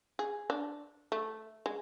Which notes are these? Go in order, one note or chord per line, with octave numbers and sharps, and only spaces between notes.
G#4
D4
A3
G#3